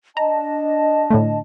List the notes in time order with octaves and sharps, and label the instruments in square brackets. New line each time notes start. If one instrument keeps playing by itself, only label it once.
[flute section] D4 D#5 A5 [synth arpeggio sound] A#5
[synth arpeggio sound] A2 D3 A3